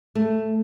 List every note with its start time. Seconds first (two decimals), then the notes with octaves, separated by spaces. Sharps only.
0.15 A3